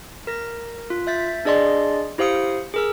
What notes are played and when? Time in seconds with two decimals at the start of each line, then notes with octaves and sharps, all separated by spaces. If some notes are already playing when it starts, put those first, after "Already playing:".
0.27 A#4 A#6
0.90 F4
1.07 E5 G6 A6 B6
1.45 D4 G#4 D5 D#5 C6
2.18 E4 G4 C5 F5 D#6 C#7
2.74 G#4 A#4 E6